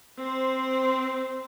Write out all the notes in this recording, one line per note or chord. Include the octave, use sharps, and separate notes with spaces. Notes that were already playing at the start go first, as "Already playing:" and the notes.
C4 C5